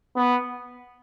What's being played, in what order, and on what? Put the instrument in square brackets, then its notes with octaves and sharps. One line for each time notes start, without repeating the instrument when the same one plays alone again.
[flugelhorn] B3